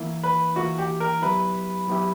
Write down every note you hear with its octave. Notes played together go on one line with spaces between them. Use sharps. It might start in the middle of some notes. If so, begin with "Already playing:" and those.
Already playing: E3 A#3 E4
B4
E3 A#3 E4 F#4
G4
A#4
F#3 B3 E4 G4 B4
F#3 B3 E4 G4